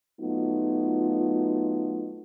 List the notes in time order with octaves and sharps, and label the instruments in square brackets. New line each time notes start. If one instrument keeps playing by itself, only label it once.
[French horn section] F#3 A3 B3 D#4 F4